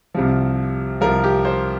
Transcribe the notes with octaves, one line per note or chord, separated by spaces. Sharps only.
C2 C3 F3
C2 C3 F3 A#4
G4
C5